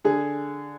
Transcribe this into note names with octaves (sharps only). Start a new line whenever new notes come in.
D3 G#4